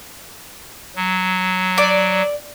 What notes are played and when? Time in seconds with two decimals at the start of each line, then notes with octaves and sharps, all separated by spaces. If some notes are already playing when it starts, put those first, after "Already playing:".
0.96 F#3
1.78 D5